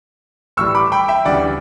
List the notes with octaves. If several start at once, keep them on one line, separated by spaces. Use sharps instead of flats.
A2 E3 G3 C#6 E6
B5 D6
G5 B5
E5 G5
D2 C#3 E3 G3 D5 F#5